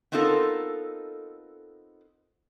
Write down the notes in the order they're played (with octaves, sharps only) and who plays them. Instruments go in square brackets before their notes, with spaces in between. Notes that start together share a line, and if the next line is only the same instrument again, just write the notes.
[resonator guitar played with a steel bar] B3 C4 D#4 F4 A4 A#4